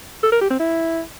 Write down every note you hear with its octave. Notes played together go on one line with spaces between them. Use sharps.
A4
A#4
G4
C4
E4